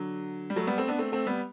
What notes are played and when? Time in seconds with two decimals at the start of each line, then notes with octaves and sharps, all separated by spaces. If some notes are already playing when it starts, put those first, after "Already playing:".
Already playing: D3 F#3
0.50 G3
0.56 F#3 A3
0.67 G3 B3
0.78 A3 C4
0.88 B3 D4
0.98 A3 C4
1.12 A3 C4
1.26 G3 B3